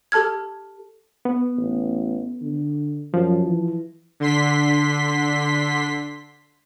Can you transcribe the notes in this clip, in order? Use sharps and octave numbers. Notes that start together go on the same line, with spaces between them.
G4 A4 A5 F6 G#6
B3
A1
D3
F#2 F3
E3
D3 C6 B6